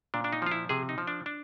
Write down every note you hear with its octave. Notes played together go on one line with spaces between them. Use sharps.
A#2 D4
D4
D#4
F3 F4
E4
C3 G#4
D#4
F3
D4
D4